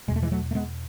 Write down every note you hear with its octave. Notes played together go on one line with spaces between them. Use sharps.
E2 B2 G#3
A3
E3 G#3
F#3 A3
A3
G#3 B3